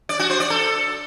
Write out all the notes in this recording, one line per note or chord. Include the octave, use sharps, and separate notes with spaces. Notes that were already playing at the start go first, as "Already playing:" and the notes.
D5
F#4
C5
D5
A4